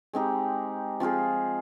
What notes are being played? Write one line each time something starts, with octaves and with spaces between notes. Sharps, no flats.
G#3 C4 D#4 G4
F3 C4 F4 G#4